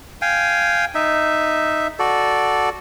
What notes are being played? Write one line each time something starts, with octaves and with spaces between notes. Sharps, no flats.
F5 G5 G#5
D#4 E5
F#4 A4 D5